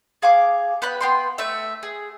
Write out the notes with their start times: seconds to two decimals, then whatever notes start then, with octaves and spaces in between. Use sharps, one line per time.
0.22 G#4 F5 G#5 D6
0.82 B3 G5 B5 F#6
1.01 B3 G5 C6
1.38 A3 E5
1.83 G#4